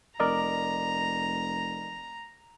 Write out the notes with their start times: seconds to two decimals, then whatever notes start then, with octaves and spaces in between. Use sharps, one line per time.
0.20 F1 A#4 D5 D#5 A#5